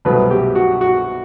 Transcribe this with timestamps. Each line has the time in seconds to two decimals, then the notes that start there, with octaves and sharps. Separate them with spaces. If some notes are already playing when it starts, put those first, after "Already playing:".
0.05 C2 B2 F#3 A3 B4
0.31 G4
0.55 F#4
0.81 F#4